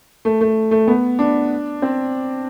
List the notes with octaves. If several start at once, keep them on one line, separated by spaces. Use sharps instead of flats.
A3
A3
A3
B3
D4
C4